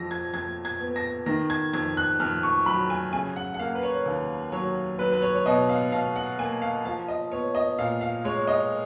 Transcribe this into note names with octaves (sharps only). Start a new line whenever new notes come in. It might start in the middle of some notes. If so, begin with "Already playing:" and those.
Already playing: F2 F3 A#6
G#6
F2 G#6
G#6
B3
A#6
D#3 A#6
G#6
F2 G#6
F#6
F2 F6
C#6
F#3 B5
G#5
C#3 G#5
F#5
F#5
A#3 F5
B4
C#5
D#2
F#3 C#5
F#3 B4
B4
C#5
C#5
B2 D#5
F5
B2 F5
F#5
A#3 G#5
F5
F3 F5
D#5
B3 C#5
D#5
A#2 F5
F5
G#3 C#5
D#5